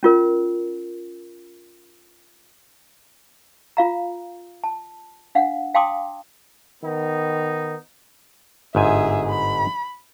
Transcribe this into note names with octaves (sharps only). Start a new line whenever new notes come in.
C#4 F4 A#4
F4 F5 A#5
A5
D4 F5 F#5
F5 G5 A5 C6 D6 D#6
D#3 B3 D#4
G1 G#2 G#4 E5 G#5
B5